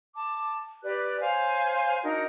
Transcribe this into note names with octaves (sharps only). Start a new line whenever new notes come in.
A5 D6
G4 B4 D5 F#6
C5 C#5 F5 G#5
D4 D#4 F#4 A#4